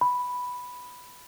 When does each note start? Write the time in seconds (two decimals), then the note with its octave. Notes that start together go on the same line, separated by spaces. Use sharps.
0.01 B5